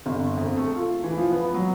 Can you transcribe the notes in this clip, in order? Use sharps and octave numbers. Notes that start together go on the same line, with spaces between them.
G1
F2
A3
F4
E3
F3
B3
F#3